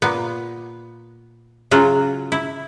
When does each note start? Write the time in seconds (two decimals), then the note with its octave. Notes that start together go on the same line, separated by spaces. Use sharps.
0.02 A#2 B3
1.71 C#3 F#3 F4 F#4
2.32 E4